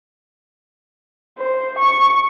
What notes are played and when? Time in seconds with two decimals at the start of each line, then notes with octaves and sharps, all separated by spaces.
1.39 C5
1.79 C#6